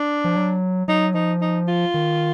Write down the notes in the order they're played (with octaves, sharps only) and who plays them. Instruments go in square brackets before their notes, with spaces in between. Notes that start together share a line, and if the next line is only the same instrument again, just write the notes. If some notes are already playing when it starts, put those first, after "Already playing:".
Already playing: [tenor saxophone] D4
[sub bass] F3
F#3
[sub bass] F#3 [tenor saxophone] D#4
[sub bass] F3 [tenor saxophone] D#4
[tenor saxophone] D#4
F4
[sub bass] D#3